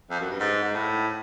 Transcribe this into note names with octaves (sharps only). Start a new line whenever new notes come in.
F2
F#2
G2
G#2
G#2
A2